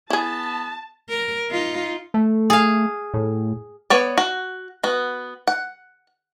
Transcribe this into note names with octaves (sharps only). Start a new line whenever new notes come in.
B3 E4 G#4 A5
A#4
D#4 F4
A3
G#4 F5
A2
B3 C#5 D5
F#4
B3 F#4
F#5